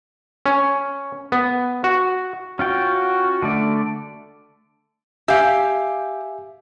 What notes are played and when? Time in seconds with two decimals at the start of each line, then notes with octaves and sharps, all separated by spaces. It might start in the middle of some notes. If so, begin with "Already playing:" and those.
0.46 C#4
1.32 B3
1.84 F#4
2.59 C#4 F4 F#4 G5
3.42 D3 A3 D5
5.28 G4 E5 F5 G#5